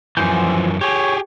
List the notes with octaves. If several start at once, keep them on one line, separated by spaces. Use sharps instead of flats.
F#2 E3 F3 G#5 G6
G4 G#4 C#5